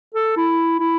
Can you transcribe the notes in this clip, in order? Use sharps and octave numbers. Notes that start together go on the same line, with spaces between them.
A4
E4
E4